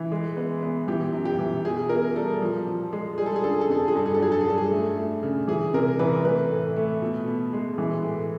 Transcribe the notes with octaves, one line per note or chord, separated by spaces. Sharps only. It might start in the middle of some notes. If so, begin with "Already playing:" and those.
Already playing: E3
G#3
B3
B3
E3 G4
F#2
G4
E3
B2 G#4
B2 A#4
G3 A4
F3
F3
G#3
G3 G#4
A4
G#4
D3 A4
G#4
A4
F2 G#4
A4
G#4
G2 A4
G#4
A4
F#3 G#4
A4
G#4
G2 A4
G#4
A3
A3
C#3
E3 G#4
C3 A#4
E3 B4
A3 B4
A2
A3
B2
B2
G#3
E3
A2